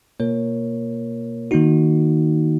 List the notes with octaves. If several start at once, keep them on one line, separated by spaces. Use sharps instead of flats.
B2 A#3 F4 A#4 C#5
D#3 A#3 D#4 F#4